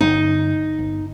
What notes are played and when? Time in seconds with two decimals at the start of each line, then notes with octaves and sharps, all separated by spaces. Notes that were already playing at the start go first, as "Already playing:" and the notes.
0.01 G1 D#4
0.79 G1